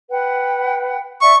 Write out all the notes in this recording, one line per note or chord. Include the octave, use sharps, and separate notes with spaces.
B4 F#5 G5
D5 E5 F#5 C#6